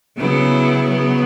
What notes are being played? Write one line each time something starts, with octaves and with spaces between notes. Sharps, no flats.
C#3 F#3 B3 E4
C#3 F#3 B3